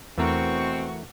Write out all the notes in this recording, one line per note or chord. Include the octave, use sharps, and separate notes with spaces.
E2 B2 E3 A3 C4 F#4 A#4 C#6